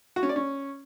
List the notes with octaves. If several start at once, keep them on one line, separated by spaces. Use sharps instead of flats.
F#4
C#4
D5
C#4